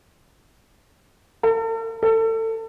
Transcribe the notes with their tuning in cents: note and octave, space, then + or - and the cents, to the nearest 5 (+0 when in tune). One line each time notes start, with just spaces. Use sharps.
A4 +45
A4 +30